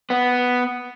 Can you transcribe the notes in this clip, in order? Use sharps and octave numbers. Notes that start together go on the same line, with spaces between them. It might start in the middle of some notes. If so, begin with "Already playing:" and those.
B3